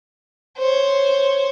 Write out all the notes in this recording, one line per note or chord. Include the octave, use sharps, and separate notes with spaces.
C5 C#5